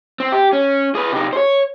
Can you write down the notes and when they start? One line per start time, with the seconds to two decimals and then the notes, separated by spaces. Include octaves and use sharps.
0.20 C4
0.32 G4
0.53 C#4
0.95 G#4 B4
1.13 C3 D#4
1.33 C5 C#5